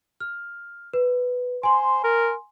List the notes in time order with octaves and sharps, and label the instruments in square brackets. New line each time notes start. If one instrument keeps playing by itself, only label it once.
[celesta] F6
B4
[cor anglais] C5 [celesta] G#5 C6
[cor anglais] A#4